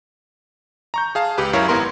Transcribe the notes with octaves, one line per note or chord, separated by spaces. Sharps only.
A#5 C#6 G6
G#4 F5 A5
C#2 G4 B4
F#2 E4 A#4 C#5 F5
G#1 B3 E4 A#4 C6